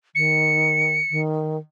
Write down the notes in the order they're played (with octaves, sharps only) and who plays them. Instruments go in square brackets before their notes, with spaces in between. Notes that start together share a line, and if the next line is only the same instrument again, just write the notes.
[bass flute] D#3 [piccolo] C#7
[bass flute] D#3